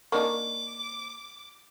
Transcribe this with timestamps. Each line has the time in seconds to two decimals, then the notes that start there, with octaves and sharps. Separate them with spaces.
0.12 A#3 D4 D#4 C#6 D6